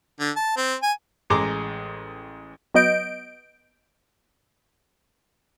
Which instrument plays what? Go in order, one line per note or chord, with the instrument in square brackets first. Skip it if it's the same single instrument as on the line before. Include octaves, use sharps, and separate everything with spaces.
[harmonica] D3
A5
C4
G#5
[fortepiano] A1 G#3 A#5 C6 D6
[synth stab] F#3 B3 D#5 G6 D7